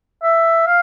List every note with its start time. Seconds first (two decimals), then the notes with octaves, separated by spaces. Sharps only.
0.23 E5
0.67 F5